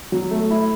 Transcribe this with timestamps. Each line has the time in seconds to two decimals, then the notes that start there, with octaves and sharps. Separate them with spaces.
0.12 F#3
0.31 A3
0.51 E4